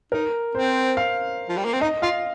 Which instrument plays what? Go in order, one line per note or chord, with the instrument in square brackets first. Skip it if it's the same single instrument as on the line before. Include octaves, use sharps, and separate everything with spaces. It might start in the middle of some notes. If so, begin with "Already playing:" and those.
[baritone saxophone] D#4 [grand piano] A#4
[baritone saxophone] C4 [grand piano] C5
[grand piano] F5
[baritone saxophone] F3
G3
A#3
C4
[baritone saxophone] D#4 [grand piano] D#5
[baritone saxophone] F4 [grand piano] F5